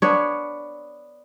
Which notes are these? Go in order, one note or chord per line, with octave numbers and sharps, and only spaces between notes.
B3 D4 C#5